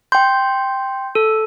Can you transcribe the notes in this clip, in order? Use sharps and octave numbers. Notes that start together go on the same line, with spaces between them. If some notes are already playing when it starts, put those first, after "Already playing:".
G5 C6 G6
A4